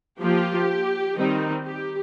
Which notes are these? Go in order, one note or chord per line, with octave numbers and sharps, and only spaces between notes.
F3 A#3 F4 G4
D#3 G3 C4 D#4
G4